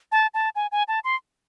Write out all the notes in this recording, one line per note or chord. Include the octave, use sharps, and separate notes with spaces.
A5
A5
G#5
G#5
A5
C6